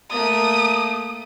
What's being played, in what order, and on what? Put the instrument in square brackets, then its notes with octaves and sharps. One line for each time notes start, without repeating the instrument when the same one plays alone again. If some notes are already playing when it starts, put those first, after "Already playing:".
[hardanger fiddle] A3 A#3 [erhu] D#6